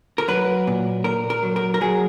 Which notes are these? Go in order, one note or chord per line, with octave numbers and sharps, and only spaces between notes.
A#4
F#3 B4
A#2
A#2 A#4
A#4
F#3
A#4
A#4
F#3 G#4